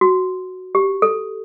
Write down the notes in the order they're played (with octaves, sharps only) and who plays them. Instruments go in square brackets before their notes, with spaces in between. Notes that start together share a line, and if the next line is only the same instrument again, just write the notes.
[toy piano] F#4
G4
A4